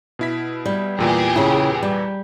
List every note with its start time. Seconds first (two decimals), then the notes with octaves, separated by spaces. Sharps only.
0.19 B2 E4 B6
0.66 G3
0.98 E2 A#2 E3 G4 G#4
1.36 C#3 E4
1.83 G3